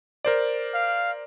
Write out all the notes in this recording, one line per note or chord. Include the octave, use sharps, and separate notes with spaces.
A#4 C5 D5
F5